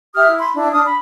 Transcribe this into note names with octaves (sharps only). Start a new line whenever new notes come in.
G4 E5 D#6 F6
E4
B5 C6
D4 E4
D4 D#6 F6
B5